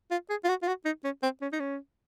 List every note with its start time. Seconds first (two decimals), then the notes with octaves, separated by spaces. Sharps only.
0.11 F4
0.30 G#4
0.44 F4
0.49 F#4
0.62 F4
0.67 F#4
0.85 D#4
1.04 C#4
1.23 C4
1.42 C#4
1.52 D#4
1.60 C#4